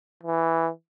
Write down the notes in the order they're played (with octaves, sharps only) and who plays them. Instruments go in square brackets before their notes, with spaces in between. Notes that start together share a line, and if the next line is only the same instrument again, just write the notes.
[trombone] E3